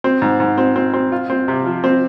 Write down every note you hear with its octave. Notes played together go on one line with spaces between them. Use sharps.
C4
G#2
G#2
C4
C4
C4
F4
C4
C3
F3
C4